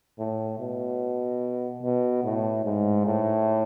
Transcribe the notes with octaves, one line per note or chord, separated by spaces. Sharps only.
A2
B2
B2
A2
G#2
A2